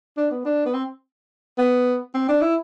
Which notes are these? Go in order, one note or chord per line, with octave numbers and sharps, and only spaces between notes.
D4
B3
D4
B3
C4
B3
C4
D4
E4